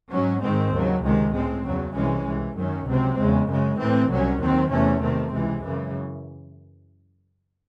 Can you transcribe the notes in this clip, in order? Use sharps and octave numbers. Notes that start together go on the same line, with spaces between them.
G#2 F#3 C#4
G#2 D#3 G#3 C4
D#2 C#3 F#3
C#2 C3 D#3 G#3
A2 G#3 C4
E2 C#3 F#3
C2 C3 E3 G#3 C#4
C2 C3 E3
F#2 D#3 F#3 C#4
C#2 C3 F#3 C4
E2 C#3 G#3
F#2 C#3 G#3
A2 E3 C4
C2 C3 F#3 C#4
D#2 D#3 F#3 C4
E2 C3 E3 A3 C#4
C3 D#3 A3 C4
C#2 C3 E3 G#3
F#2 C#3 E3